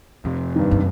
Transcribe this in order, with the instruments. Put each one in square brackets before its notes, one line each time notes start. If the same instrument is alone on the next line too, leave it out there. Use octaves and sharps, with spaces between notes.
[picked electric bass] F2 C3
[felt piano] G2 D#3
[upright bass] F#2